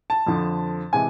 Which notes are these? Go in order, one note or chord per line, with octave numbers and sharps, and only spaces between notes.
A5
F2 D3 F3
C3 E3 G#3 G#5